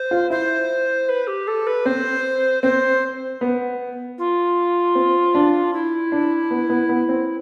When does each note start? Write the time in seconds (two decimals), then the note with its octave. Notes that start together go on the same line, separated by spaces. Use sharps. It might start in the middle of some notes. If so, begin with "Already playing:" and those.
Already playing: C5
0.11 F4
0.30 E4 C5
1.09 B4
1.27 G4
1.47 A4
1.66 B4
1.85 C4 C5
2.63 C4 C5
3.41 B3
4.18 F4
4.95 C4
5.35 D4
5.73 E4
6.12 D4
6.51 B3
6.70 B3
6.89 B3
7.09 C4